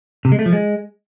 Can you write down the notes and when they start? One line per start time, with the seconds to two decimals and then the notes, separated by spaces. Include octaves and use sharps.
0.25 C3
0.32 G#3
0.39 A3
0.46 F3
0.53 G#3